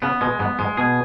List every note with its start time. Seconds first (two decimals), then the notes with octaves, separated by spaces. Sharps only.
0.02 C#3 B3
0.21 B2 G#3
0.39 G#2 B3
0.59 G#2 G#3
0.77 B2 G#4